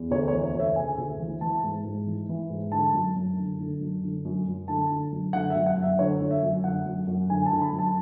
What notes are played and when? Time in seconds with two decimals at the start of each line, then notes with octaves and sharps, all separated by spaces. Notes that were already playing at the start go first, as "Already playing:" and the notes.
Already playing: E2
0.11 D2 C#5
0.28 C#5
0.33 E3
0.43 C#5
0.54 D2
0.60 E5
0.76 C#3 G#5
0.98 D2
1.20 E3
1.41 E3 A5
1.63 G#2
1.85 G#2
2.06 E3
2.29 E3
2.50 G#2
2.72 D3 A5
2.94 F#2
3.16 F#2
3.38 D3
3.60 D3
3.81 F#2
4.03 D3
4.25 F#2
4.47 F#2
4.68 D3 A5
4.90 D3
5.12 F#2
5.33 D3 F#5
5.50 E5
5.56 F#2
5.66 F#5
5.77 F#2
5.82 E5
5.99 D3 C#5
6.20 D3
6.31 E5
6.43 F#2
6.64 D3 F#5
6.86 F#2
7.07 F#2
7.30 D3 G#5
7.46 A5
7.51 D3
7.61 B5
7.73 F#2
7.78 A5